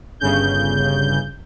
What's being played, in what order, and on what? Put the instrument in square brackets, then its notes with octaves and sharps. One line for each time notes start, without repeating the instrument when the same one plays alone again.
[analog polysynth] G1 C#3 G6